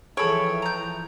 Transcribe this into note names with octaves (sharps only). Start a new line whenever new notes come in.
E3 F3 G#4 A4 C#5 G5 B5
A#5 G6